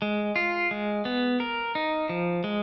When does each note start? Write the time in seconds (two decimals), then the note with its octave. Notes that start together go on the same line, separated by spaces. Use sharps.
0.02 G#3
0.36 F4
0.71 G#3
1.05 B3
1.40 A#4
1.75 D#4
2.09 F3
2.44 G#3